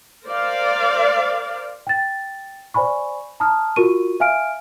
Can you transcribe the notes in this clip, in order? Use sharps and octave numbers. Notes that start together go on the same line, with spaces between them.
A#4 C5 D5 F5
G5 A6
C5 D5 G#5 B5 C#6
A5 A#5 D#6 F6
F4 F#4 A#4 C#6 D#7
E5 F5 G#5 F6 D7